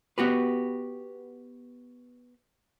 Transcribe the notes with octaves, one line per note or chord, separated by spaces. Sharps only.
B3 F#4 G4 B4